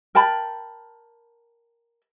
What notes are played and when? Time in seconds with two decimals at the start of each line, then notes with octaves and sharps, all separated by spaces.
0.15 A#4 G5 A5 B5